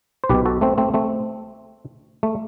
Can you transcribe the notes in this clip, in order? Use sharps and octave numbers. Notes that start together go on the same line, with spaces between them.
C5
B1 B2 G4 B4
F#4 A4
A3 C4
A3 C4
A3 C4
A3